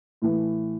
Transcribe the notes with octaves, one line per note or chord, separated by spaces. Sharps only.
A2 E3